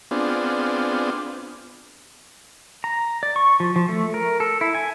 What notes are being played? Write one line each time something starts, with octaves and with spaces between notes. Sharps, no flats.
B3 C4 D4 F4 G#4
A#5
D5
C#6
F3
F3
A3
A#4
A4
E4
G#5